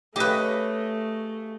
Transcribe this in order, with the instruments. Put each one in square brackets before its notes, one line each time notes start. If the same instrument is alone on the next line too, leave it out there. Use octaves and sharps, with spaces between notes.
[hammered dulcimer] C#3 D#5 [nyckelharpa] A3 [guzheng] G4 B4